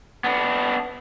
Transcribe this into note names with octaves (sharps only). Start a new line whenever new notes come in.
B3 D4